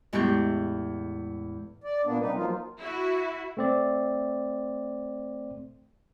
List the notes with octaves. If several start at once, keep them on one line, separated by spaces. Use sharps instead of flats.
E2 A2 G#3 G4 C#6 G6
D5
A#2 A#3 B3 D4
C3 G3 D#4 B4
F3 F#3 A#3 D#4 F4
E4 F#4
A3 C4 D5